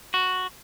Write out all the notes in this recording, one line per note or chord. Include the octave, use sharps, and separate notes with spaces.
F#4